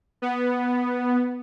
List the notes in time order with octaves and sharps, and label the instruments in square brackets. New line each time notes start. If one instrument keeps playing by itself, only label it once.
[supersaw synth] B3